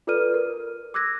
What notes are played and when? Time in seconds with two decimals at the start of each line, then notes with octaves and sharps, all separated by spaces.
0.07 F4 A4 B4 D5 F6 D#7
0.34 A#4
0.94 D6 E6 F#6 G#6 A#6